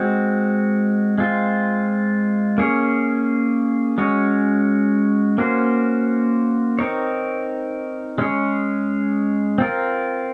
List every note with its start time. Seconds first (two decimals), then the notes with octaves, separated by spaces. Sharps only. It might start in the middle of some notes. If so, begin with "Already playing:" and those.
Already playing: G#3 C4 F#4
1.18 G#3 C4 F4
2.58 A#3 C#4 G#4 C#5
3.98 G#3 C#4 F#4 C#5
5.38 A#3 C#4 F#4 C5
6.79 C4 D#4 A#4 C#5
8.18 G#3 C#4 G#4 C#5
9.58 C4 F4 A#4